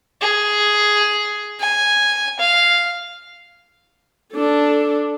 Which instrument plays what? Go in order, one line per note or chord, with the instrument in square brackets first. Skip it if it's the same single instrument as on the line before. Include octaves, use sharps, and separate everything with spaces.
[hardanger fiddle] G#4
G#5
F5
[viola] D4 A4